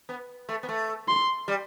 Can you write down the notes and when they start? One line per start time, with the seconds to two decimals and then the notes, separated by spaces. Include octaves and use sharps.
0.09 B3
0.49 A3
0.63 B3
0.69 A3
1.08 C6
1.48 G3